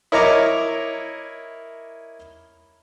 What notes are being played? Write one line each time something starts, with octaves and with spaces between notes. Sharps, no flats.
E4 A#4 C#5 D#5 A#5 D6